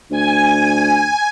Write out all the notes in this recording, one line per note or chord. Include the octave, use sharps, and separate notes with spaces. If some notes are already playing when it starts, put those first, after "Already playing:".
D2 G#5